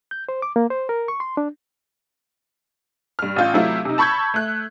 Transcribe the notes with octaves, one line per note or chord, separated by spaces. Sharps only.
G6
C5
D6
A#3
C5
A#4
C#6
C6
D4
G2 F6
A1 F4 G6
C3 F#3 A3 E4 F4
C3 D#4
A5 B5 C#6 E6 G6 G#6
A3 F#6